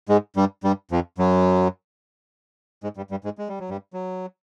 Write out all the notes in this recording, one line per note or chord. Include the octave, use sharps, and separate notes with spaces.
G#2 G#3
G2 G3
G2 G3
F2 F3
F#2 F#3
G#2 G#3
G2 G3
G2 G3
G#2 G#3
G#3
G3
F#3
G2 G3
F#3